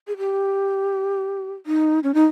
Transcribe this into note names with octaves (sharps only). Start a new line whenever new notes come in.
G#4
G4
D#4
C#4
D#4